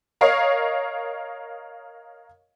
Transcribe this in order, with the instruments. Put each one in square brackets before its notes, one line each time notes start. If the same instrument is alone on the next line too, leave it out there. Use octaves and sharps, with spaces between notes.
[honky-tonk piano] A#4 C#5 D#5 F5